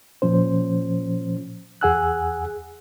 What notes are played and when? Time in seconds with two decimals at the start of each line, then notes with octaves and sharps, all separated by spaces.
0.22 A#2 F3 C#4 C5
1.81 E2 G#4 F#5 G#5 E6 F#6